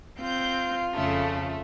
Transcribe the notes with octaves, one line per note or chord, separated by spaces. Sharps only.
C4 F4 G6
F2 C#3 A3